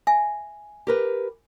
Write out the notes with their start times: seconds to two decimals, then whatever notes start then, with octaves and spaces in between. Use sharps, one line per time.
0.07 E5 G#5
0.87 G4 A#4 B4